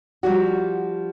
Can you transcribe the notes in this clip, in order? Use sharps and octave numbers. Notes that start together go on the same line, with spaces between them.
F3 G3 F#4